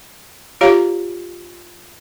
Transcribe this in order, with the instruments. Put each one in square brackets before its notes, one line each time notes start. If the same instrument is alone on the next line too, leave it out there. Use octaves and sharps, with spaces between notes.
[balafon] F4 G4 C#5 F5 A#5